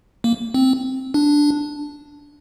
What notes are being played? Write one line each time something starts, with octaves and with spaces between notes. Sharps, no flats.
A#3
C4
D4